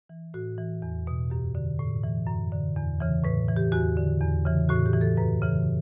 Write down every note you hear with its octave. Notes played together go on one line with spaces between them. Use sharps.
E3
A2 F#4
E3
E2
B2
F#2 G4
D3
A2
E3
F#2
D3
E2
C#3 E3
A2 B4
E3
G4
E2 F#4
D3
E2
C#3 E3
A2 F#4
G4
E3
A4
F#2 B4
C#3 E3